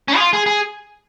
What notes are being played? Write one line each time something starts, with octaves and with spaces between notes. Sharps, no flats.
C#4
G#4
F4
G#4
G#4